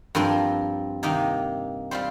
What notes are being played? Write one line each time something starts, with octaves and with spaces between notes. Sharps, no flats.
G2 F3 C4 A#4
C3 D#3 A#3 D#4
G3 C4 F4 C5